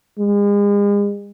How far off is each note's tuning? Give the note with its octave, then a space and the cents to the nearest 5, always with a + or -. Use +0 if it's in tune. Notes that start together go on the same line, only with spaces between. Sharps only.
G#3 -40